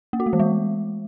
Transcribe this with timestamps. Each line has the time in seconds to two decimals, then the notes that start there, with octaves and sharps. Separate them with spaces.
0.13 A#3
0.20 F#4
0.26 A3
0.33 E3
0.40 G#3